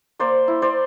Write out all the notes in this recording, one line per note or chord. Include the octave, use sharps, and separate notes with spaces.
A#3 C5 D5
E4
C5 D5